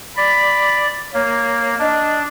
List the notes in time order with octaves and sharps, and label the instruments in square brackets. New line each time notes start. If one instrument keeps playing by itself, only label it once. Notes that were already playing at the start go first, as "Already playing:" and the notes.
[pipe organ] D5 [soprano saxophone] B5
[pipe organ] A#3 [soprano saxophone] C#5
[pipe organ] D4 [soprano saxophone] D#5